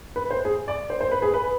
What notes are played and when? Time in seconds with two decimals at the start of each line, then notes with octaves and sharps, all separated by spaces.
0.16 B4
0.31 C5
0.45 G#4
0.68 D5
0.90 C5
1.01 C5
1.11 B4
1.22 G#4
1.34 B4